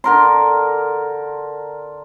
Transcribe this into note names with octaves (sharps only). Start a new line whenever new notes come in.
D3 A#4 C6